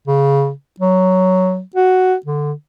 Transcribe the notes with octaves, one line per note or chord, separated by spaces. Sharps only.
C#3
F#3
F#4
D3